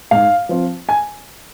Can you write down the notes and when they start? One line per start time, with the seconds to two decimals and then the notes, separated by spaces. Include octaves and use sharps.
0.11 G#2 F5
0.49 F3 C4 F4
0.89 G#5